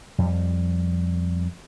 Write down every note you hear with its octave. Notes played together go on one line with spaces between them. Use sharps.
F2 G3